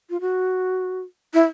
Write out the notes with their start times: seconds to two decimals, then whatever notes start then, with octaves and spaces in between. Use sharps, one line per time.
0.10 F4
0.21 F#4
1.34 E4